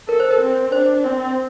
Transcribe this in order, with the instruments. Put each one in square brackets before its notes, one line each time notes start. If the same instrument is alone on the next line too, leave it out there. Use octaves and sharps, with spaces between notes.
[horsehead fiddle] A4 [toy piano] A#4
[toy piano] C5
A#4
[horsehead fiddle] C4
[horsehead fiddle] D4 [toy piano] C5
[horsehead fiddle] C4